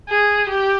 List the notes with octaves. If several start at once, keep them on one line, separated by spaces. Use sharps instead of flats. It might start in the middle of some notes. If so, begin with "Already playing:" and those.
G#4
G4